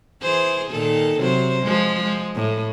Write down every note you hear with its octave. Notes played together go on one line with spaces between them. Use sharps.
E3 G#4 C5
A#2 D#3 A4
C3 F#3 C5
F3 G#3
G#3
A2